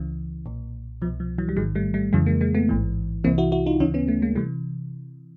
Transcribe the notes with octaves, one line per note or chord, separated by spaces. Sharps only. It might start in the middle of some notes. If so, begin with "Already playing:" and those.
Already playing: C#2 C#3 E3
B1 A#2
C2 B2 F3
F3
E3 F#3
G3
A1 G#2 D#3 F#3 G#3
G3 A3
G3 A3
F2 C#3 E3 F#3 G#3
G#3 A#3
G#3 A#3
A3 B3
A1 G#2 E3
C2 C3 E3 A#3 C4
E4 F#4
E4 F#4
D#4 F4
D2 C#3 E3 C#4 D#4
B3 C#4
A3 B3
G#3 A#3
C3 E3 G3 A3